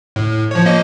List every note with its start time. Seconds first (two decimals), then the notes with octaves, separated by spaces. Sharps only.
0.16 A2
0.32 A2
0.51 F3 C#5
0.65 F3 A#3 D#5